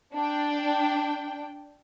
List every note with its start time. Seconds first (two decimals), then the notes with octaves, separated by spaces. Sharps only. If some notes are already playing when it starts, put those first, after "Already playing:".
0.14 D4 G5